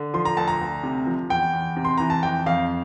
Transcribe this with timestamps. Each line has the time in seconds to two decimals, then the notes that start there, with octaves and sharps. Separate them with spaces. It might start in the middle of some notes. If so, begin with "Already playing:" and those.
Already playing: D3
0.14 F3 C6
0.25 A#5
0.37 D2 A5
0.48 A#5
0.61 D2
0.83 C3
1.06 F3
1.29 E2 G5
1.53 E2
1.76 C3
1.85 C6
1.98 E3 A#5
2.10 A5
2.23 F2 G5
2.46 F2 F5